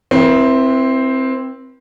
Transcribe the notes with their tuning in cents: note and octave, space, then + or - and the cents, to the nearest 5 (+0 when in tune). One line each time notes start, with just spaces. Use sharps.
C4 +0 E4 +0 B4 -45